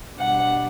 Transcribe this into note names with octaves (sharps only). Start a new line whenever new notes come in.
B2 G3 D4 F#5